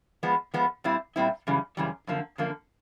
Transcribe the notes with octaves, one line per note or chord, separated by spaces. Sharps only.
F3 G#3 B3
F3 G#3 B3
A#2 G3 C4 E4
A#2 G3 C4 E4
F#2 C#3 E3 G3
F#2 C#3 E3 G3
F#2 D3 F3 A#3
F#2 D3 F3 A#3